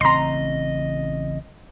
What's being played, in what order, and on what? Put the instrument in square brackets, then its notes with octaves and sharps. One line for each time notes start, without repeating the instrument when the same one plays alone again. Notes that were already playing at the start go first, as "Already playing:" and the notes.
[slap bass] A1 C#3 C4 [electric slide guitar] D#5 [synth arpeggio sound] A#5 C6